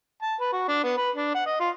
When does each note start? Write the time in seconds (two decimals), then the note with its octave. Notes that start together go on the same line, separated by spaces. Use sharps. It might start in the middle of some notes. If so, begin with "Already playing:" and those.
0.22 A5
0.40 B4
0.53 F#4
0.68 D4
0.83 B3
0.97 B4
1.15 D4
1.35 F#5
1.46 D#5
1.60 F4